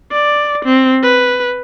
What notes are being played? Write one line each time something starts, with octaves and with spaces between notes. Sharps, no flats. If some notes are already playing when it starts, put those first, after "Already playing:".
D5
C4
B4